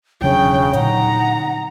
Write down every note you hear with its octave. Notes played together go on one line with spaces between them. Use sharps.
E1 C#3 F#3 D4 G5
A#2 D3 F#3 D#4 F#5 A#5